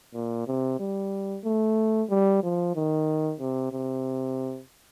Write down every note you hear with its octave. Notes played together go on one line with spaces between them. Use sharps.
A#2
C3
G3
A3
G3
F3
D#3
C3
C3